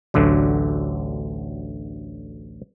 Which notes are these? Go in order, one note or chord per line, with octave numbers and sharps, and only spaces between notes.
A1 D2 D3 F#3